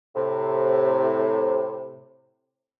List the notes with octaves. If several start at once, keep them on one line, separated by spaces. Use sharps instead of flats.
A2 C3